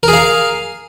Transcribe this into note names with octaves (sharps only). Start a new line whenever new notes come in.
G#4 A#4 F5